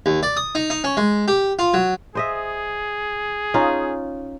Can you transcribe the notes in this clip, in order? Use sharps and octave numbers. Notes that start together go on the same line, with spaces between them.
D#2
D5
D#6
D#4
D#4
C#4
G#3
G4
F4
F#3
G#4 C5 D#5 E5
C#4 D#4 F4